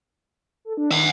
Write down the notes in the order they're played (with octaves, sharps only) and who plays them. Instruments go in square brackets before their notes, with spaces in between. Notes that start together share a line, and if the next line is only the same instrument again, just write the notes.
[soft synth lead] A4
D4
[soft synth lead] D#3 [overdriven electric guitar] E5 F#5